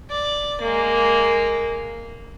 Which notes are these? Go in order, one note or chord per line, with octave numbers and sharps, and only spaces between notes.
D5
G#3 A#3